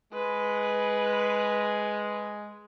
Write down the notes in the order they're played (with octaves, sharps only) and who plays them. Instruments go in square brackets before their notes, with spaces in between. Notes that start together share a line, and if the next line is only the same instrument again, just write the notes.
[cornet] G#3 [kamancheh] B4